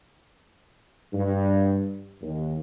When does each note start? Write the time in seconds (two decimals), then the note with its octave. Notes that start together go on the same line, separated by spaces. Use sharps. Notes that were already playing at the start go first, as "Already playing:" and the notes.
1.14 G2
2.22 D#2